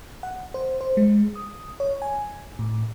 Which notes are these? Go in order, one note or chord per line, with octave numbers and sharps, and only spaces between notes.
F#5
C5
C5
G#3
D#6
C#5
G#5
A2